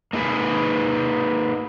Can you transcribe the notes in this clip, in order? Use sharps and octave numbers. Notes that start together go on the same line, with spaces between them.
A#3 D#4 G#4 B4